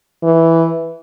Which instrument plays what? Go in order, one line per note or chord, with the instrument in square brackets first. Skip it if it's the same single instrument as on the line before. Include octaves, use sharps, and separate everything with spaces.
[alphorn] E3